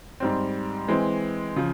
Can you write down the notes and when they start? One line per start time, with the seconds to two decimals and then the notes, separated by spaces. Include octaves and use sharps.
0.20 G#2 G3 C4
0.88 E3 G#3 C4
1.56 C#3 F3